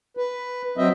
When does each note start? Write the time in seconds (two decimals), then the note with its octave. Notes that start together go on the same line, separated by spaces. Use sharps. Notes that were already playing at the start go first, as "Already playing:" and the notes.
0.17 B4
0.78 F#3 C4 D#5 E5